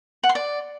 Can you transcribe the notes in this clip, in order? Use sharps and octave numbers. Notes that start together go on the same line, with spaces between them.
F#5
C6
D5